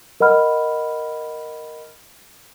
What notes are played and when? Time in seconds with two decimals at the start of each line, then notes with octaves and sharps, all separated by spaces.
0.20 A#4 D#5 F#5 B5 F6